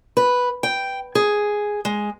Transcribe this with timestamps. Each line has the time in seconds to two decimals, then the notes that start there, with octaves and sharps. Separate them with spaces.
0.17 B4
0.63 G5
1.15 G#4
1.85 G#3